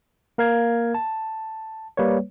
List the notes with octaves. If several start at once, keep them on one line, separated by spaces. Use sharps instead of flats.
A#3 A#4 F5 G#6
A5
G3 A#3 B4 C#5